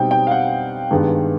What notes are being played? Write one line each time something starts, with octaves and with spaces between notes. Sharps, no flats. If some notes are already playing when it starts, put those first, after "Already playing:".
Already playing: B2 G3 C4 D#4 G5
G5
F5
F#5
G2 D#3 G#3 B3